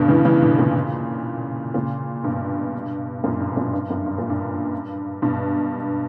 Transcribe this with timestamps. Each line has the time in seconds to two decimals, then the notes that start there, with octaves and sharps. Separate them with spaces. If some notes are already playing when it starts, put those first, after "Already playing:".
Already playing: G2 B2 D3
0.08 C#3 E3
0.25 C#3 E3
0.42 B2 D3
0.58 A#2 C#3
1.74 A#2 C#3
2.23 G2 B2
3.24 F#2 A#2
3.40 G2
3.52 B2
3.56 F#2 A#2
3.73 G2
3.90 F#2
4.06 G2
4.18 A#2
4.30 G2
5.22 G2 B2